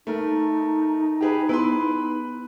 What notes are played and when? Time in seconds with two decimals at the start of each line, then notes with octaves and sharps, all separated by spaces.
0.07 A3 D#4 A#4
1.21 G4 G#4 B4
1.49 B3 E4 B4 B5 C6